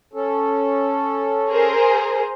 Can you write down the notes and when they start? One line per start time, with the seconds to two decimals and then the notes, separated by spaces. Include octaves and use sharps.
0.13 C#4 A4
1.51 G#4 A#4 C5